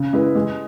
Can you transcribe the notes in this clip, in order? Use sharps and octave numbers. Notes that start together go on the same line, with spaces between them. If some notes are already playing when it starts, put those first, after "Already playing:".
Already playing: C#3
G#3 E4 B4
G#3